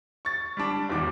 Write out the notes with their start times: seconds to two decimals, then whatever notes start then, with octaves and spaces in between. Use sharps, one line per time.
0.25 C#6 A6
0.57 G3 D4
0.89 E1 E2 G#2 D#3 D6